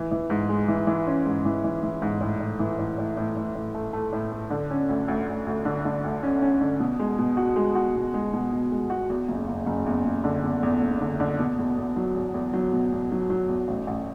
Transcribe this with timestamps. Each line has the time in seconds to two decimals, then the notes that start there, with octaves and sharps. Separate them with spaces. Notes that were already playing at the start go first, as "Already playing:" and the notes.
Already playing: E3
0.11 E3
0.30 G#2
0.49 G#3
0.68 E3
0.87 E3
1.07 C#4
1.26 G#2
1.45 E3
1.64 E3
1.83 E3
2.02 G#2
2.21 A2
2.40 A2
2.59 E3
2.79 A2
2.98 A2
3.17 A2
3.37 A2
3.55 A2
3.75 A3
3.93 A3
4.12 A2
4.32 A3
4.50 D3
4.70 C#4
4.89 D2
5.08 D2
5.28 D2
5.47 D2
5.65 D3
5.85 D3
6.04 D2
6.23 C#4
6.42 C#4
6.61 D3
6.80 B2
6.99 G#3
7.19 B2
7.37 F#4
7.56 G#3
7.75 F#4
7.95 B2
8.14 G#3
8.33 B2
8.52 B2
8.71 G#3
8.90 F#4
9.10 E2
9.28 F#1
9.48 F#1
9.66 F#1
9.86 E2
10.05 F#1
10.24 D3
10.44 E2
10.63 E2
10.82 F#1
11.01 D3
11.20 D3
11.39 B2
11.59 E2
11.77 E2
11.96 F#3
12.16 E2
12.34 E2
12.53 F#3
12.73 B2
12.92 E2
13.12 F#3
13.30 F#3
13.49 E2
13.68 A1
13.87 A1